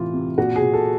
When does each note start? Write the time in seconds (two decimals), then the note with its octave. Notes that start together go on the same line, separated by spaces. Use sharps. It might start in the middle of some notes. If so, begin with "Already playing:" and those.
Already playing: A2 C3 E3 F4
0.13 C3
0.38 A#2 F#4
0.56 G#4
0.61 A#2
0.74 A4